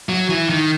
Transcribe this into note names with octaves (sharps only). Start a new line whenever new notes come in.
F#3
E3
D#3